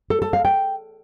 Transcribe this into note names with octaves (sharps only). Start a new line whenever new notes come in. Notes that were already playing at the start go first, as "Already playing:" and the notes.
A4
A4
F5
G5